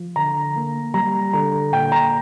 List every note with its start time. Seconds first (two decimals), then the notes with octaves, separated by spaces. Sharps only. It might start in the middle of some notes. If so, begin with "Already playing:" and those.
Already playing: F3
0.16 D3 A#5
0.55 A#3
0.94 G3 A#5
1.33 D3 A#5
1.73 A#2 G5
1.92 A#5